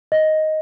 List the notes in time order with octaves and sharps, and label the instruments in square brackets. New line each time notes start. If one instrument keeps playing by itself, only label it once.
[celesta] D#5